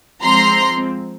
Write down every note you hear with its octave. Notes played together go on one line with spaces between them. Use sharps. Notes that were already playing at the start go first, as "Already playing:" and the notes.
F3 G#3 C4 A#5 C6